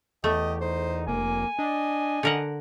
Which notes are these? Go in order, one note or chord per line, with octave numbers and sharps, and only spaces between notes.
E2 A3 G4 D#5
D#4 C5
F1 A#3 G#5
D4 D#5
D3 A#4 F#5